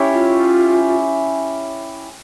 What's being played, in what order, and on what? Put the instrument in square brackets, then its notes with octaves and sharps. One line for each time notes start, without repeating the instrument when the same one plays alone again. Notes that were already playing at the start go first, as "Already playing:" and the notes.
Already playing: [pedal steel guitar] C#4 E4 G4 C#5
[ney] F4